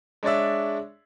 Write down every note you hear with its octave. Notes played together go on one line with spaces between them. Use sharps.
G#3 D4 C#5 D5 E5